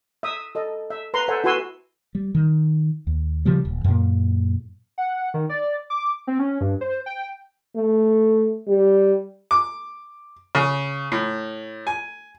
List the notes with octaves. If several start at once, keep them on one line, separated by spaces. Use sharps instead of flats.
E5 D#6
A4 D#5
E5
B4 A#5 C6
A4 C5 E5 F#5 G#5
E4 F#4 B4 G#5 C6 E6
G3
D#3
D#2
C#3 F3 G3
D#1
F#2 A#2
F#5
D#3
D5
D6
C4
C#4
G2
C5
G5
A3
G3
D6
C#3
A2
G#5